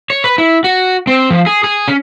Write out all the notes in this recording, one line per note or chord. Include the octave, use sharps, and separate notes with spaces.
C#5
B4
E4
F#4
C4
F3
G#4
G#4
C#4